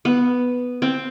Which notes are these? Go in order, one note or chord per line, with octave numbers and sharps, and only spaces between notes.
B3
C4